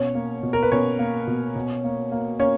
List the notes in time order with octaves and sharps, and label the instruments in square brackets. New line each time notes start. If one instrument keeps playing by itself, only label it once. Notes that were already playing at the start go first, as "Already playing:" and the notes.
Already playing: [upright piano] B2 C#4 C#5
A#3
B2
A#4
B4
B2 C#4 C#5
A#3
B2
B2
A#3
A#3
A#3 C#4 C#5